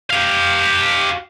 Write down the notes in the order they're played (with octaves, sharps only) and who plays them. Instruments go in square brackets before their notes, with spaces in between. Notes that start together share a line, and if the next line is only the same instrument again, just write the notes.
[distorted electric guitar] G4 F5